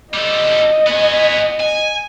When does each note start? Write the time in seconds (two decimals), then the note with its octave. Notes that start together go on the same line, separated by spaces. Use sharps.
0.14 G3 A4 D#5
0.87 B3 G#5
1.60 G#5